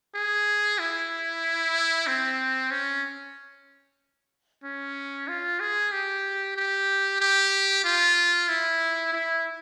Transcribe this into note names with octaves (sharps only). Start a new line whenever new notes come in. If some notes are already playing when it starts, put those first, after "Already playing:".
G#4
E4
C4
C#4
C#4
F4
G#4
G4
G4
G4
F4
E4
E4